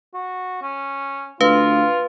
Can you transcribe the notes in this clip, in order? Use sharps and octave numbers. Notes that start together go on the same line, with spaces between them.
F#4
C#4
D2 F4 B4 F5